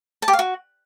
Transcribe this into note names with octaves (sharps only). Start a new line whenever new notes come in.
A5
G4
F5
F#4